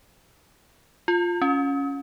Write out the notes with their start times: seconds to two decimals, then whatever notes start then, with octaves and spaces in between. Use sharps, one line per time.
1.08 F4
1.42 C#4